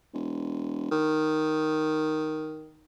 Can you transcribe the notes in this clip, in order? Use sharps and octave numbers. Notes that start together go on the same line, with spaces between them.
E1
D#3